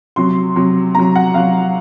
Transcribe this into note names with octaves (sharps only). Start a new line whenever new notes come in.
C3 F#3 C6
C3 F#3
C3 F#3 A#5
F#5
C3 F#3 F5